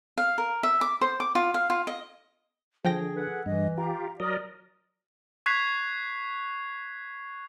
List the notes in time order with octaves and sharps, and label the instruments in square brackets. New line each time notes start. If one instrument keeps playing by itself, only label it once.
[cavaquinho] F5
A#4
E5
D6
C5
D6
F4
F5
F4
D#5
[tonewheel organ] D3 [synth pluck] F3 G5 A#6 [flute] G#4
[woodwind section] A4 B4 F#5
[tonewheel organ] G2 [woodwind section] E3 [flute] D#5
[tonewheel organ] F4 G4 [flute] A#5
[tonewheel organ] F#3 A#4 D#5 [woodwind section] D5 [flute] D#6
[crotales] C#6 F#6 G#6 B6 C7 F7